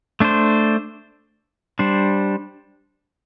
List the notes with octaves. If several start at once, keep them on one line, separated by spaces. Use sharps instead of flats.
A3 D4 C5
G3 D4 C5